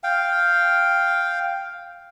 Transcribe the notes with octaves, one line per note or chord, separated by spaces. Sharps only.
F5 G5